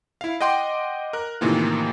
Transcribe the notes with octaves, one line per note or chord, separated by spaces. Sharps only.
E4 F5
D#5 F#5 G5 C6 D6
A#4 F#6
A2 C3 D#3 E3 A#3 F4